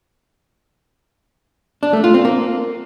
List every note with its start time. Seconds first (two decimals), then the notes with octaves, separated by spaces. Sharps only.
1.83 D4
1.93 A3
2.04 F4
2.14 C4
2.25 A#3